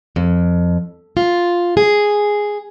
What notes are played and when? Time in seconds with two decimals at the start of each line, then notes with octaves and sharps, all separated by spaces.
0.16 F2
1.17 F4
1.77 G#4